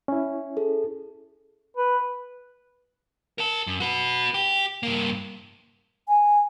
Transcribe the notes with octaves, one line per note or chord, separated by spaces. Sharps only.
C#4 E4
G#4 A4
B4
A#4 A5
F#2
F#4 B4
G4
G2 A#3
G#5